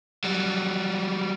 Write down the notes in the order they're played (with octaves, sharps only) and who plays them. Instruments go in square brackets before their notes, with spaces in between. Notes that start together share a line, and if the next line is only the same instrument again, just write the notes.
[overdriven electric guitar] F#3 G3